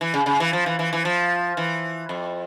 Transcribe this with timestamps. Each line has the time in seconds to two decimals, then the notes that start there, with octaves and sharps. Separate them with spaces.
0.01 E3
0.14 C#3
0.26 C#3
0.40 E3
0.53 F3
0.66 E3
0.79 E3
0.93 E3
1.05 F3
1.57 E3
2.09 F2